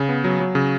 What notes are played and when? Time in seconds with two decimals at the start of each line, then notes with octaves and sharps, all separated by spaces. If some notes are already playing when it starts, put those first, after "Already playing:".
Already playing: C#3
0.09 B3
0.24 F#3
0.40 F#3
0.55 C#3